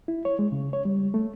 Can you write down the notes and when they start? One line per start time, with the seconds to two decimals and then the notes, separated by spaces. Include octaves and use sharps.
0.08 E4
0.25 C#5
0.39 G#3
0.52 C#3
0.73 C#5
0.85 G3
1.14 A3